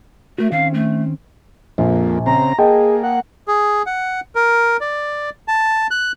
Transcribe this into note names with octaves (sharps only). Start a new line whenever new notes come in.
A3 F#4 A#4
D#3 C4 C#4 F5
A3
A#1 F2 A#2
C#3 C4 A#5
A#3 G#4 D#5 G5 A5
F#5
G#4
F#5
A#4
D5
A5
F#6